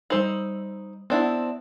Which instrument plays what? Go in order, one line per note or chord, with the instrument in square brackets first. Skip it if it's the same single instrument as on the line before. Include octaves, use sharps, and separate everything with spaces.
[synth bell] G3 E6 F#7 [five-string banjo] D#4 C5
[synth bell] B3 F#5 [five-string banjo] C4 D4 E4